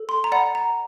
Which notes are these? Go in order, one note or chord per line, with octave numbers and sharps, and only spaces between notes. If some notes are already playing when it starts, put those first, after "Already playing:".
Already playing: A4
C6
A#5
D5 F#5 B5
A#5